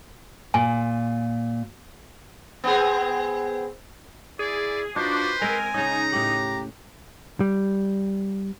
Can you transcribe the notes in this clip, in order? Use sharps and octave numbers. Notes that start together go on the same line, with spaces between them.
A#2 G#5
B3 C4 G#4
E4 G#4 D5
D4 D#4 F4 F#4 B4 C5 D6
G#3 C4 A#4 G#5
C#3 C#4 D#4 A#5
A2 G4 F#5
G3